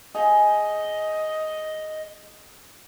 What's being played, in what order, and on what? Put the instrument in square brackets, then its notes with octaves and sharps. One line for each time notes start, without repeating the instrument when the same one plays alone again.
[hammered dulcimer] G#4 [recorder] D#5